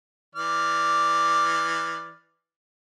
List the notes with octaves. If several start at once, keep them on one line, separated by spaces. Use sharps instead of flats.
E3 D5 F6